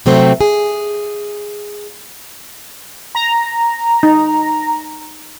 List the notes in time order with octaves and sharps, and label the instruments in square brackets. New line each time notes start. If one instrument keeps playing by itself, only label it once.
[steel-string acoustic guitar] C3 F#3 A3 C4
G#4
[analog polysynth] A#5
[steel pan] D#4